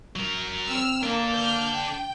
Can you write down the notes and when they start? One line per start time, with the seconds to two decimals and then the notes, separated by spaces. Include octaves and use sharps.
0.16 F#3 A#4
0.67 C4 E6 F6
1.03 A#3 D4 A4 A#4
1.32 F6 G6
1.73 G5